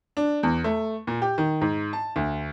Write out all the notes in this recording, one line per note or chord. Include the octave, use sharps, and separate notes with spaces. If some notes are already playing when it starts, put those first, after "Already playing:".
D4
E2
A3
A#2
G4
D#3
G#2
A5
D2